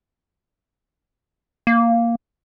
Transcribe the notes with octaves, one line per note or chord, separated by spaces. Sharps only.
A#3